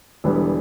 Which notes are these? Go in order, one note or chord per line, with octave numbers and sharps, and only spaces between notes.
E1 E2 D3 G3 B4